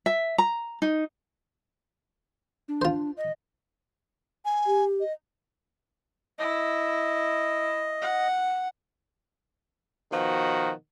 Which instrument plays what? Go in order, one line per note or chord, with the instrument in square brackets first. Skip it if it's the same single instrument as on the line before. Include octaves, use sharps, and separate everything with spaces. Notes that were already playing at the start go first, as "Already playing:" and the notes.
[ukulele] E5
A#5
D#4
[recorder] D4
[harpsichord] F4 C5
[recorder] D#5
[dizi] G#5
[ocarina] G4
[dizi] D#5
[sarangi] E4 [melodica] D#5
[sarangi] F#5
[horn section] B2 D#3 F3 F#4